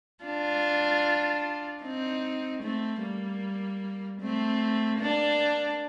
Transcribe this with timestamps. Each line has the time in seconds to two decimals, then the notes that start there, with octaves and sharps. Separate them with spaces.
0.24 D4 F4
1.83 C4 D#4
2.63 A3 C4
3.02 G3 A#3
4.21 A3 C4
5.00 A#3 D4